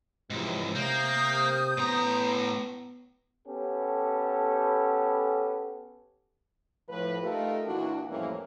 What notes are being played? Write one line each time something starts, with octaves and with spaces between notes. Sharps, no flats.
C#2 G#2 C3 E3 F3
C3 A#3 D#6 G6
A2 B3 A#5
B3 C#4 G4 A4
A2 F3 B4
A3 D#4 F4 G4 A4 A#4
A#2 E3 D4 E4 F#4
F2 A2 E3 G3 A#3 C#4